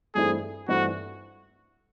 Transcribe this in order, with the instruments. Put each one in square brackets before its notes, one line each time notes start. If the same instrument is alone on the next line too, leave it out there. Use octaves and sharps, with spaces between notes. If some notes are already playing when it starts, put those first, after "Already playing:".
[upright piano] G2 E3 A3 C4 E4 [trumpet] G#4
[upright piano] G2 E3 A3 C4 E4 [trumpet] F#4